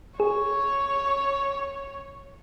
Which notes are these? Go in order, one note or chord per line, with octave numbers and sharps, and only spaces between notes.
G#4 C#5 C#6